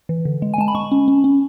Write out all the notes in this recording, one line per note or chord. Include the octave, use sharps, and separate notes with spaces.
E3
D3
G#3
G#5
G#3 A5
B5
G#3 C#6
C#4
C#4
C#4